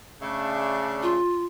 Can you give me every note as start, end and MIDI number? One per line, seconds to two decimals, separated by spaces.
0.21 1.16 49
0.21 1.16 57
0.21 1.16 62
1.02 1.45 65